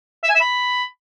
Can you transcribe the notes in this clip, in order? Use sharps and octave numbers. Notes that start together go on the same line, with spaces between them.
E5
G#5
E5
B5